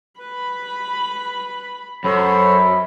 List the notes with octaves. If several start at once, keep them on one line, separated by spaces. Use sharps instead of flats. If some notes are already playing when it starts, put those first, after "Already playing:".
B4 B5
F#2 A4 C5 C#5 B5